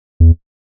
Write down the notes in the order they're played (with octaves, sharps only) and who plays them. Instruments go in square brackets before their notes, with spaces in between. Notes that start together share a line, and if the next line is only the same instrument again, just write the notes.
[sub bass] E2